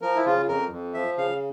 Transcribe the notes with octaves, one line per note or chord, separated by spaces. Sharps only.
F3 A#4
E4
C#3 F4
F2 A#4
F2
F3 E5
C#3 F5